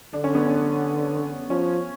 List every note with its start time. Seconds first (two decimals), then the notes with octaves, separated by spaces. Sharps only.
0.13 D3 D4
0.24 C#4
0.35 B3
0.46 C#4
1.50 F3 C#4